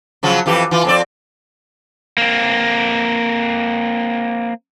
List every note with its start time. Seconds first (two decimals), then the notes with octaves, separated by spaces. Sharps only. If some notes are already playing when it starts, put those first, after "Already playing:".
0.23 C#3 F3 F#3
0.46 F2 E3 G4
0.71 E3 F4
0.85 F2 C4 D5
2.18 A#3 C4